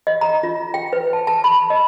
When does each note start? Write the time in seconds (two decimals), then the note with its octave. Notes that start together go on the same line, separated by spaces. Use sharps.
0.07 D#5
0.21 A#5
0.43 F4
0.74 G5
0.93 B4
1.13 A5
1.27 A5
1.44 B5
1.70 D#5